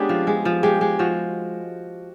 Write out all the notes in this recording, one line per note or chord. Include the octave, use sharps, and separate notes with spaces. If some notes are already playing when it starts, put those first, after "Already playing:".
Already playing: G#3 B3 C#4 D4 G4 G#4
F3
G#3
F3
G#3 G4
G#3
F3 F#4